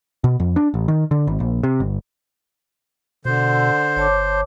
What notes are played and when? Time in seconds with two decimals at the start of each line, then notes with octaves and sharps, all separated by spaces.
0.24 B2
0.40 F2
0.56 D4
0.74 A1
0.88 D#3
1.11 D3
1.27 G#1
1.40 A#1
1.63 C3
1.80 G1
3.25 B2 D3 C5
3.96 G1 C#5 A5 D6